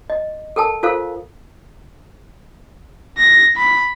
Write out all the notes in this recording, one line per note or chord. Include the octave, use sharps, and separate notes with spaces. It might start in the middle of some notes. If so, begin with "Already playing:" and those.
D#5
A4 A#4 G5 A5
F4 A4 A#4 C5 F5
A#6
B5